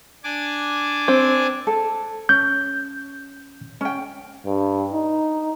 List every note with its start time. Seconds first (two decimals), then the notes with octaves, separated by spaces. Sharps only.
0.24 D4 G#5 D6
1.08 C4
1.67 A4
2.29 C#4 G6
3.81 C#4 G5
4.46 G2
4.93 D#4